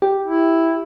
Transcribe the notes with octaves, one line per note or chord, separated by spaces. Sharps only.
G4
E4